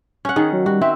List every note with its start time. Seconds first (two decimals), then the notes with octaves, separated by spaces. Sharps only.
0.25 C#4 F#5
0.36 D#3 G#4
0.53 F#3
0.66 G3 F#4
0.82 C4 E5